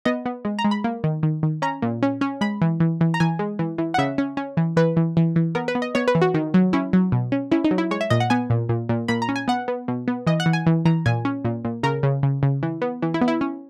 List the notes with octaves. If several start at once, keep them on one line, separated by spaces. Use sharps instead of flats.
B3 D#5
B3
G#3
A#5
G#3
B5
A#3
D#3
D#3
D#3
C#4 A#5
A#2
C#4
C#4
G#3 B5
E3
E3
E3
A#5
E3 G#5
G#3
E3
E3
F#5
C#3 E5
C#4
C#4
E3
E3 B4
E3
E3
E3
B3 A#4
B4
B3
D#5
B3 C#5
B4
E3
F#4
D#3
F#3
C#4 E4
F#3
B2
C#4
C#4 E4
D#4
F#3
E4
G#3 C#5
E5
A#2 D#5
F#5
B3 G#5
A#2
A#2
A#2
A#2 B5
A#5
C#4
G#5
B3 F#5
B3
B2
B3
E3 D#5
F#5
E3
G#5
E3
E3 A#5
A#2 G#5
C#4
A#2
A#2
C#3 A#4
C#3
C#3
C#3
E3
B3
E3
E4
B3
E4
C#4